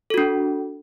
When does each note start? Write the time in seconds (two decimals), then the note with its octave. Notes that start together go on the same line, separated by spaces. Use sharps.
0.10 A4
0.14 F#4
0.18 D4